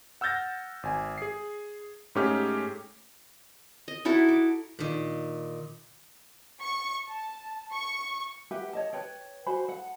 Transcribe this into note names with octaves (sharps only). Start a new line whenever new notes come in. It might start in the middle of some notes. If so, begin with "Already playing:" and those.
F#5 E6 F6 G6 A6 A#6
G#1 G#5
G#4 C7
G#2 A3 C#4 G4 G#4 F6
D#5
D#4 E4 F#4 A4
D6
A#2 D#3
C#6
A5
C#6
G4 B4 E5 F#5
C#5 D#5 A5
B4 C#5 G5
F#4 C5 G#5 B5
A4 F#5